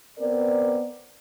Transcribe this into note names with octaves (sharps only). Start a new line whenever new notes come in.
B3 C4 A#4 D5